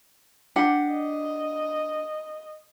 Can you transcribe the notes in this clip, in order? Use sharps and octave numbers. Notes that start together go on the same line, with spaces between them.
D4 G4 F#5
D#5